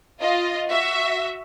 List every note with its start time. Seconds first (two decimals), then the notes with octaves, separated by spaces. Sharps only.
0.22 F4 D#5
0.69 F#4 E5